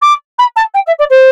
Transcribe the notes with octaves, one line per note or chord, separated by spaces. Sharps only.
D6
B5
A5
G5
E5
D5
C5